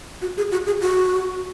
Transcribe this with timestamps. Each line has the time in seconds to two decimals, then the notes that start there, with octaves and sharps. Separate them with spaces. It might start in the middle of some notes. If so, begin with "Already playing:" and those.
0.22 F#4
0.37 G#4
0.52 F#4
0.67 G#4
0.81 F#4